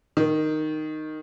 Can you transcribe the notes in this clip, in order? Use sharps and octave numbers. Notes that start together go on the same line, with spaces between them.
D#3